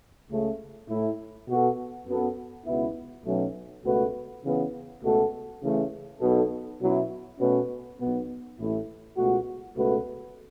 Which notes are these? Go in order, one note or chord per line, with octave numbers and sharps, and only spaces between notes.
C#2 C#3 A3
A2 A3 E4
B2 B3 F#4 A4
F#2 F#3 B3 A4
C#2 B2 B3 E4
B1 B2 F#3 A3 C#4
C#2 B2 A3 F#4 B4
C#3 E3 B3
C#2 B2 A3 F#4 A4
C#3 E3 A3
B1 B2 B3 A4
B2 F#3 C#4 E4
B2 A3 C#4 F#4 B4
B1 B2 B3
A1 A2 A3 E4
C#2 B2 A3 F#4
C#2 B2 A3 F#4 B4